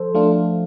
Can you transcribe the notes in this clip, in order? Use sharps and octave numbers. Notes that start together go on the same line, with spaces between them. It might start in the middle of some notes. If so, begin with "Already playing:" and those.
Already playing: F3 A4 C5
F3 A3 D4 F4